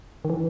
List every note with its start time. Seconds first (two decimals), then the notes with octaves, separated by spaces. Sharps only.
0.25 D#3
0.30 E3